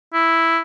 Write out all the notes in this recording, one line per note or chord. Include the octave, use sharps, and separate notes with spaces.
E4